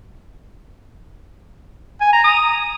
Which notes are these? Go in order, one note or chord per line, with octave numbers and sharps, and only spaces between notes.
G#5
A#5
D#6